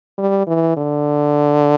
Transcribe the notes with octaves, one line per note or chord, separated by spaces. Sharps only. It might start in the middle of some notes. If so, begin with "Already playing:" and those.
G3
E3
D3